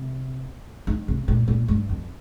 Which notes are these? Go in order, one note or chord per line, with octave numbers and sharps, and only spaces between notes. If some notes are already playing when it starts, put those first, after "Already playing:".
Already playing: C3
D#3
C3
A#2
A#2
G2
F2